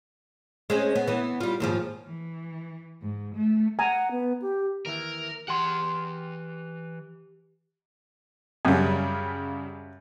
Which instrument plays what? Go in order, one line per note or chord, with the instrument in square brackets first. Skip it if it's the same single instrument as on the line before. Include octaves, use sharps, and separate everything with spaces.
[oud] G#3 C4 C#4
B3
E3 B3
G3 F4
D#2 G#2 F3
[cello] E3
G#2
A3
[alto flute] F#5 [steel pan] G#5 A#5
[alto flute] B3
G4
[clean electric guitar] D#2 E3 E4 [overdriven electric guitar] A#4
[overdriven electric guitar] E3 F#5 [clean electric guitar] G4 C6
[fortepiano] F#2 [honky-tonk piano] C#3 G3